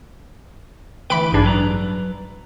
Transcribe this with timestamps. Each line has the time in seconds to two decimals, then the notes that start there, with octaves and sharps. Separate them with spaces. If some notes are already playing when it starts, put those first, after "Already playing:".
1.10 D2 E3 B4 G5 B5 D7
1.32 A1 G2 D4 D#4 G#4
1.44 F#3 B4 A#5